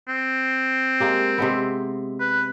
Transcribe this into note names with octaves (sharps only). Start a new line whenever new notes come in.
C4
G#3 A#3 G4
C3 G#3 B3
B4